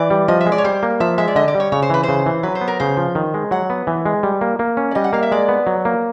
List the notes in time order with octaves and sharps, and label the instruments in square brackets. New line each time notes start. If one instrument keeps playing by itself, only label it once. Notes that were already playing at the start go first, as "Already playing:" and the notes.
Already playing: [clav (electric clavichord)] E3 [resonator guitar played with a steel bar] D5
[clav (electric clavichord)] G3
[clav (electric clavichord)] F3 [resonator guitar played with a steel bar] D#5
[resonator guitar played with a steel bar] E5
[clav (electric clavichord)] G#3
[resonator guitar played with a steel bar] D5
C#5
[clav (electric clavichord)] G3 [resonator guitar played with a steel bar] C5
[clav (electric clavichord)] A#3
[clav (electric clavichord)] F3 [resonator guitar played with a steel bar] E5
[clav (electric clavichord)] G#3 [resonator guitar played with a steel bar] E5
[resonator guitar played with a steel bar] D5
[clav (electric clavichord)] D3 [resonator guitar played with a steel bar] D#5
[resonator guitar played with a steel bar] D5
[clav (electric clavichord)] G3
[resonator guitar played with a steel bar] C#5
[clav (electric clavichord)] C#3 [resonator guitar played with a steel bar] C#5
[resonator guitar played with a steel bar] C5
[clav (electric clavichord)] E3 [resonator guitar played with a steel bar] B4
[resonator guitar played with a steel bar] C5
[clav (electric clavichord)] C#3
E3
[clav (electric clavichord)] F#3 [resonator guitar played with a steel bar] B4
[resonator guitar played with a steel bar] C5
[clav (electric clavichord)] B3
[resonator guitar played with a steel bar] A#4
[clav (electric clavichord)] C#3 [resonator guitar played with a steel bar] C5
[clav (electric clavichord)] F3
D#3
G#3
[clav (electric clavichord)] F#3 [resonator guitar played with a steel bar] F#5
[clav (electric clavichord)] B3
E3
G#3
G3
A#3
A#3
C#4
[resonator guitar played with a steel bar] D5
[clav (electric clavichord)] G3 [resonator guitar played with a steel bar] D#5
[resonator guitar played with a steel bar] F#5
[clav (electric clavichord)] A#3 [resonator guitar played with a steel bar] F5
[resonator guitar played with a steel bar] E5
[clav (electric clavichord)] G#3 [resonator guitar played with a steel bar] D5
[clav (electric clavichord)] B3
F#3
A#3